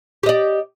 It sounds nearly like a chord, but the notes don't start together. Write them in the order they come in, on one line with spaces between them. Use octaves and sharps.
G4 D#5 D5